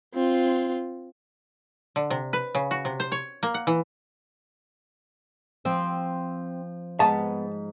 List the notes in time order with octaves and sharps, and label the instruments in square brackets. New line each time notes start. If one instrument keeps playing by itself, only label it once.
[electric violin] C4 F4
[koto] D3
C3
B4
C#3
F#4
C3
C5
C#5
A#3
F#5
E3
[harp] F3 [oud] C4
[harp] G#2 [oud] B3 [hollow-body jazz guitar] A5